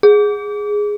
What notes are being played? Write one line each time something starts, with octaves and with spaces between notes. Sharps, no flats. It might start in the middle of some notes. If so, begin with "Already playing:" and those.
G#4